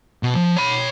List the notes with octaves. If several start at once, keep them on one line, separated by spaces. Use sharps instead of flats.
B2
F3
C#5 B5